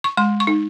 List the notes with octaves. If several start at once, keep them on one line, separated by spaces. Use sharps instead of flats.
C#6
G#3 C6
C#6
D#4